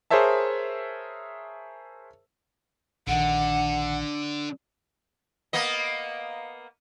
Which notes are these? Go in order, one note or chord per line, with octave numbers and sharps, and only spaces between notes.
G#4 A#4 C5 C#5 E5 A5
A#1 D3 D#3 F#5
A#3 B3 D#5